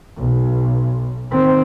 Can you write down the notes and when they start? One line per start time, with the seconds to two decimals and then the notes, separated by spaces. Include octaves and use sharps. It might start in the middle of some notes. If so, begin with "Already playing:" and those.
0.17 B1
1.31 D#3 C4